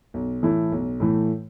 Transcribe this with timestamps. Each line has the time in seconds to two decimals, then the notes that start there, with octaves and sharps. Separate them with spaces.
0.14 B1
0.43 A2 E3 A3 E4
0.72 B1
1.00 A2 E3 A3 E4